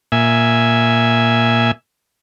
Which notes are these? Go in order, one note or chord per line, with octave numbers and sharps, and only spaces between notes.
A#2 E5 G#5